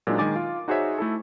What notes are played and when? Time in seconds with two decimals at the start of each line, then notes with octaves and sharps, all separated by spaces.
0.07 A#2 F#3 G#3 D4 D#4
0.18 D#3 G#3 G#5 D6 A6
0.36 F4
0.68 D#4 F#4 G#4 C5 C#5 E5
0.98 A3 E4 A4